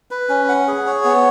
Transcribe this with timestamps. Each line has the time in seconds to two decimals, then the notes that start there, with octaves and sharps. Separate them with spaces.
0.11 B4
0.29 C#4
0.49 F#5
0.68 G#4
0.87 C#5
1.04 B3